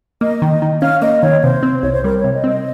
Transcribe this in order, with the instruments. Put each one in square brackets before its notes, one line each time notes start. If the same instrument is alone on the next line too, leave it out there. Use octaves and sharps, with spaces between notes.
[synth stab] A#3 [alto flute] D#5
[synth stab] D#3
D#3
[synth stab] C#4 [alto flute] F5
[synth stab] A#3 [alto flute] D#5
[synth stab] D#3 [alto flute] C#5
[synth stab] C3 [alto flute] C5
[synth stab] C4
[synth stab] C2 [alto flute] C#5
[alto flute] C5
[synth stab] G3 [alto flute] A#4
[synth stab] C3 [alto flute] C#5
[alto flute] D#5
[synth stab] C4
[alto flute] D#5